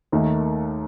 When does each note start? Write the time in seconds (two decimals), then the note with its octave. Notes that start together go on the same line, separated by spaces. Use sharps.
0.12 D#2 D#3 A3